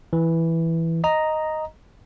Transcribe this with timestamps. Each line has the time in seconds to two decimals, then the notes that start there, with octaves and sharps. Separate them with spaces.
0.13 E3
1.04 D#5 A#5